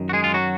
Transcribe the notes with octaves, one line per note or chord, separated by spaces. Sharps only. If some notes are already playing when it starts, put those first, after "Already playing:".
Already playing: F#2 D#3
F#4
G#3 G#4
F4
F#3 F#4